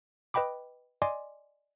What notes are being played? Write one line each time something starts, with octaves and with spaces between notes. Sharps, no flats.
B4 D#5 G5 B5 D6
D5 D#5 G#5 C6 D6